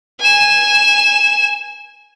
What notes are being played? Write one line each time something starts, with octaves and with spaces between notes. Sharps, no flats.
G#5 E7